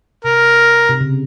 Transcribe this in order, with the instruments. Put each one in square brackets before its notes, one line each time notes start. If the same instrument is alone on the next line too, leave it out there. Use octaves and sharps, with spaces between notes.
[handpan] C3 [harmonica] A#4
[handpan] C3
C#3